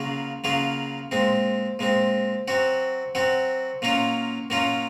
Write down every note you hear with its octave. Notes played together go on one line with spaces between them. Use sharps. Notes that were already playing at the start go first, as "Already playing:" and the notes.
Already playing: C#3 F#3 A#3 F4 G#4
C#3 F#3 A#3 F4 G#4
A#2 G#3 C4
A#2 G#3 C4
F#3 C4 F#4
F#3 C4 F#4
A#2 F#3 A#3 C#4 F4
A#2 F#3 A#3 C#4 F4